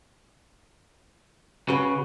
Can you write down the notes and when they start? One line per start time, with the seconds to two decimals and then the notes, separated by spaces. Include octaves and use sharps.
1.69 C#3 F#4 B4